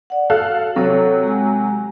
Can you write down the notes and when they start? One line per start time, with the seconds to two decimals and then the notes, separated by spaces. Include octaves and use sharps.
0.10 D5 F#5
0.30 F#4 A4 F5 F#6
0.76 C3 F#3 A4 C#5
1.23 G#3 G#5